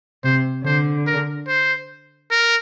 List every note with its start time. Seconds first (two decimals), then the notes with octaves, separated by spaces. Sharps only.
0.23 C3 C5
0.65 D3 C5
1.07 A#4
1.48 C5
2.31 A#4